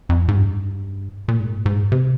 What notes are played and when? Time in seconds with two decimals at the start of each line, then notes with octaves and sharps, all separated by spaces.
0.09 F2
0.28 G#2
0.36 G2
1.28 A#2
1.40 G#2
1.57 A#2
1.66 G#2
1.92 C3